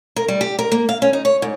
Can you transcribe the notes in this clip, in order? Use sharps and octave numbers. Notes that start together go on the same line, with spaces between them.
A#4
G3
G4
A#4
A#3
F5
C#4
D#4
C#5
G#2